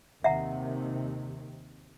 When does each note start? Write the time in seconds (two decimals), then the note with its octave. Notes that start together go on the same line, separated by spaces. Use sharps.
0.24 D#2 C3 D#3 E5 F#5 A#5